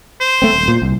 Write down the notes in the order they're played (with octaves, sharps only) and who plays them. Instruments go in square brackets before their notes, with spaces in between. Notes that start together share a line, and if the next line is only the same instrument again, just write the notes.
[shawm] C5
[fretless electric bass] A3 C4
D#1
A#2
C2